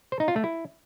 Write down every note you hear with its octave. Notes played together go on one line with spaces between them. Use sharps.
C5
D#4
F4
A3
E4